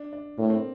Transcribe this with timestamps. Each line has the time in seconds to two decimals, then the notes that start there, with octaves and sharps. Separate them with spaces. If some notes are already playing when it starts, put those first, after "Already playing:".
Already playing: D4
0.13 D4
0.38 A2 A#3
0.50 C4